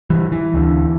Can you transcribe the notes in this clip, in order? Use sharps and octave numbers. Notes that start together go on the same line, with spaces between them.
E3 G3
E3
D2 D3